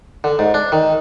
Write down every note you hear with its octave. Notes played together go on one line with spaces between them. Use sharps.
D3
G#2
D4
D#3